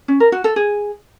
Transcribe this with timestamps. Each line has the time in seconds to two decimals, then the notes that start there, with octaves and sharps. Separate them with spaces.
0.08 C#4
0.20 A#4
0.32 F#4
0.44 A4
0.56 G#4